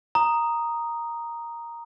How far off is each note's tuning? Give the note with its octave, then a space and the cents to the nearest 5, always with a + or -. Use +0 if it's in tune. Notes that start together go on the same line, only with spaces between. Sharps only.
A#5 +0 D#6 -5